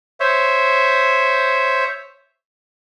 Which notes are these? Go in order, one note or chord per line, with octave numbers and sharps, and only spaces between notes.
C5 C#5 E5